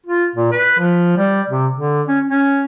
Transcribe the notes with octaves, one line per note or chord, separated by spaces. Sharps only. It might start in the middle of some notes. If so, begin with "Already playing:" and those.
F4
A#2
B4
F3
G3
C3
D3
C#4
C#4